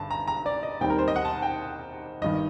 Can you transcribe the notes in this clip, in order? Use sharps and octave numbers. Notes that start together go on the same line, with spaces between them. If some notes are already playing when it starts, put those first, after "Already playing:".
Already playing: G1 G2 D3 A5
A#5
A#5
D5
D#5
D#2 D#3 G3 C4 G5
A#4
C5
D#5
F#5
A5
G5
G1 G2 D#3 D#5